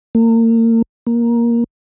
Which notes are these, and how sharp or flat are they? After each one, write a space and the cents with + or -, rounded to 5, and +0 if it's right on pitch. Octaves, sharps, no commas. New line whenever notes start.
A#3 -35
A#3 +10